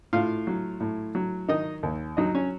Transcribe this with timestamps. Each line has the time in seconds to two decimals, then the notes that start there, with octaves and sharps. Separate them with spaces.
0.13 A2 F4 F5
0.47 F#3
0.80 A2
1.15 F#3
1.49 D#3 D#4 D#5
1.83 D#2
2.17 F#3 D#4 D#5
2.35 C#4 C#5